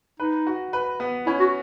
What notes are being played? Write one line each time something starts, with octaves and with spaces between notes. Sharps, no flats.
D#4 B4
F#4
B4
B3
C#4 E4
F#4